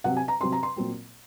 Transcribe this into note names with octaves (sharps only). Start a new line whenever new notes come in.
C3 F#3 C4 F#5
G#5
A#5
C3 F#3 C4 C6
A#5
C6
A#2 F#3 C4